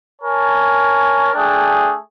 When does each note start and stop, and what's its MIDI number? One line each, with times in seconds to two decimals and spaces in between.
0.22 1.30 70
0.22 1.30 73
0.22 1.30 80
0.22 1.30 81
1.34 1.96 57
1.34 1.96 62
1.34 1.96 68
1.34 1.96 79